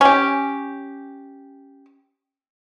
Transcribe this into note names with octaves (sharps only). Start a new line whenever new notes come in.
C#4 G4